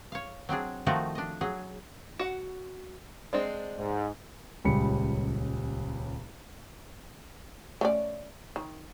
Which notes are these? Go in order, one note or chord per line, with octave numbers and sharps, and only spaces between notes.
C#5 F5
F#3 C4 D4 G#4
D#3 F3 A3 D#4 F4 F#4
D4 D#5
F#3 G#4
F#4 F#5
G#3 C4 D4
G#2
D#1 C#2 G3 B5 C#7
A3 C#4 D5
D#3